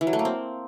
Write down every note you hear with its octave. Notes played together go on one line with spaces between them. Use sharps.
E3
F#3
A3
A#3
C4